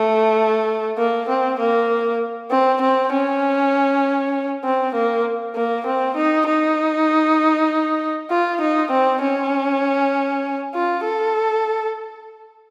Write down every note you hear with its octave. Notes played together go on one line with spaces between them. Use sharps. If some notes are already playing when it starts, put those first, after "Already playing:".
Already playing: A3
A#3
C4
A#3
C4
C4
C#4
C4
A#3
A#3
C4
D#4
D#4
F4
D#4
C4
C#4
F4
A4